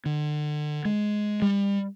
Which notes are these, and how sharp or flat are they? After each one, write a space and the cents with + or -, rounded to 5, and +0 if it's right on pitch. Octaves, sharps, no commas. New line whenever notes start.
D3 +35
G#3 +10
G3 +30